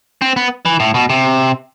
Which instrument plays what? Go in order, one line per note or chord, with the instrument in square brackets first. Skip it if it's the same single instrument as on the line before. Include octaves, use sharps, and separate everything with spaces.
[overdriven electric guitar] C4
B3
E3
A2
B2
C3